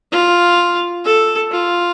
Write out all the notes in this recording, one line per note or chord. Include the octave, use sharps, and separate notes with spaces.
F4
A4
F4